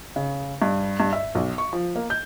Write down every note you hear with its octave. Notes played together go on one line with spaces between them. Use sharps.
C#3
G2
G2
E5
B1
C#6
F3
A#3
G6